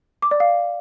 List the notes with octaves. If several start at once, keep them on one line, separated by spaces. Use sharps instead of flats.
D6
D5
F5